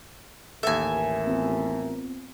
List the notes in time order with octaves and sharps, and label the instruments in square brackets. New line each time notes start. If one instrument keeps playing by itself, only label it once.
[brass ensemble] A1 A#4 [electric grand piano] D#2 A4 [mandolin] E5 G#5
[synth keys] B3 C4 F4